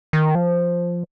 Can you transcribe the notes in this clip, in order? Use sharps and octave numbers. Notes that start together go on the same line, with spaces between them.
D#3
F3